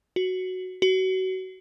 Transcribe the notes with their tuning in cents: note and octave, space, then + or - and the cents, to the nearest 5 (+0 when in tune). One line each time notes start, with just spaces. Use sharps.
F#4 +0
F#4 +25